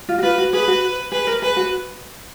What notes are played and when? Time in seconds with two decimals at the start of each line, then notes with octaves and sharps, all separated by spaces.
0.09 F4
0.19 F#4
0.22 F4 B4
0.38 F#4
0.53 G#4 B4
0.68 F#4
1.12 G#4 B4
1.27 A#4
1.42 G#4 B4
1.57 F#4